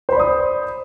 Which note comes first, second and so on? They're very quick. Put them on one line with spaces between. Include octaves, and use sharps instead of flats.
C5 B5 D5 D#6